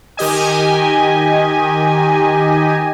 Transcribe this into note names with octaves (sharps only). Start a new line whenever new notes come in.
D#3 G4 D#5 G#5